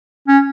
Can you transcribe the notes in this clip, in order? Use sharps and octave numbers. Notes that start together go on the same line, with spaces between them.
C#4